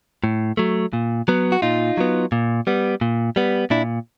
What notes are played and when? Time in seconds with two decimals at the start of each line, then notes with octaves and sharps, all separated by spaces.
0.24 A2
0.57 F#3 A3
0.93 A#2
1.28 F#3 B3
1.52 F#4
1.62 A#2 D#4 F4
1.97 F#3 B3
2.32 A#2
2.67 G3 B3
3.01 A#2
3.36 G3 B3
3.70 A#2 D4 E4